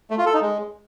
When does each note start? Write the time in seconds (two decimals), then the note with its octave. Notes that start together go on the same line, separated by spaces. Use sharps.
0.11 A3
0.18 F4
0.26 A4
0.34 D#4
0.41 G#3